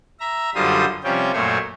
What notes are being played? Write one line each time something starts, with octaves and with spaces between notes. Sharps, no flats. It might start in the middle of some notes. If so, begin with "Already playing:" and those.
E5 A#5
F#2 D3 G3 F4 C5 D#6
C3 F3 G3 C#4 G5
F#2 A#2 A3 C5 C#5